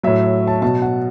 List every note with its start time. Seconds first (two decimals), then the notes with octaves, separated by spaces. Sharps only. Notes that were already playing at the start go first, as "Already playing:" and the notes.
0.03 A2 F#3 E5
0.47 A5
0.62 B2 F#3 A5
0.82 F#5